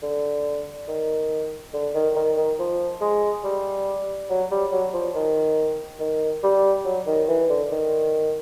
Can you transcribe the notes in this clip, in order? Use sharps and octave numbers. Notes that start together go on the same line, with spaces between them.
D3
D#3
D3
D#3
D#3
D#3
F3
G#3
G3
F#3
G3
F#3
F3
D#3
D#3
G3
F#3
D#3
E3
D3
D#3